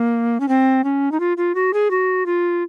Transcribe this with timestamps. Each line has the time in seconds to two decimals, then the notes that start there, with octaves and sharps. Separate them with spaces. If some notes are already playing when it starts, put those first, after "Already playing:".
Already playing: A#3
0.40 C#4
0.49 C4
0.84 C#4
1.12 D#4
1.20 F4
1.37 F4
1.55 F#4
1.73 G#4
1.91 F#4
2.26 F4